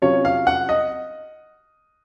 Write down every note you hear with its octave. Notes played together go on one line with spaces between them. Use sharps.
C3 F#3 C#4 F4 C#5
F5
F#5
D#5